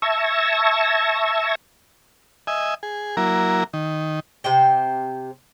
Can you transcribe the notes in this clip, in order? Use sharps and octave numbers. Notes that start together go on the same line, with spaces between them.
E5 A5 C#6 E6 G#6 A#6
D#5 E5 G#5
G#4
F#3 A#3 E4 A#4
D#3
C3 C5 G5